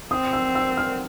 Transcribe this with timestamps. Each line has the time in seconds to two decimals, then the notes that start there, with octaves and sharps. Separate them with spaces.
0.11 C4 D#6
0.33 E6
0.55 E6
0.77 F6